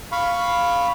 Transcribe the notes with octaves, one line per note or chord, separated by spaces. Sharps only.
F5 B5 C#6